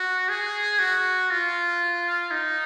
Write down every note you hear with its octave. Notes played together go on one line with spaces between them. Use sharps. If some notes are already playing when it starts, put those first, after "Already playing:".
Already playing: F#4
G#4
F#4
F4
D#4